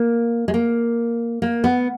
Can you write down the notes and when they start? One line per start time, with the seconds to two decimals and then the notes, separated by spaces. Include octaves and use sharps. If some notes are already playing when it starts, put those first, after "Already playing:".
Already playing: A#3
0.48 G#3
0.54 A#3
1.42 A#3
1.64 B3